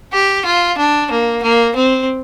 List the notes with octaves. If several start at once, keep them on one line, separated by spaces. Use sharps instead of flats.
G4
F4
D4
A#3
A#3
C4